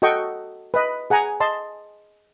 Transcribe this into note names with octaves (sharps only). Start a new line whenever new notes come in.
F#4 A4 D#5 G5 C#6
B4 D#5
G#4 F#5 G#5 A#5
D#5 A5 C6